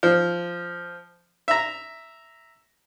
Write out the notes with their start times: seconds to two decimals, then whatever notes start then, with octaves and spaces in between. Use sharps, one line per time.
0.03 F3
1.48 E5 A#5